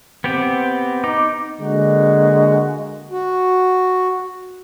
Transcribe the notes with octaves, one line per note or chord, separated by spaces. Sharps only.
B3 C4 G4
D#4 D6
D3 G#3 A#3 F#4
F#4